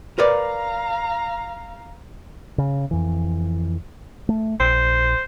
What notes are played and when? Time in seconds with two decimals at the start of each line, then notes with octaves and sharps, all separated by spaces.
0.18 A#4 B4 D5 F5 A#5
2.58 C#3
2.91 F2 E3
4.29 A3
4.60 A#1 C5